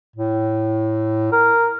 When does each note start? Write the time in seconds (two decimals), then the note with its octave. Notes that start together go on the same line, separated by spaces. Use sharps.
0.16 A2
1.32 A#4